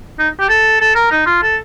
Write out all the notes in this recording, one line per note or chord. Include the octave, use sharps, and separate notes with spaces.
D#4
G4
A4
A4
A#4
D#4
F4
A4